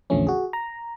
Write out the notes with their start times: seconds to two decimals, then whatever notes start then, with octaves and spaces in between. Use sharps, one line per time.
0.10 A#1 E2 D3 F3 A3 C#4
0.27 F#4 G#4
0.53 A#5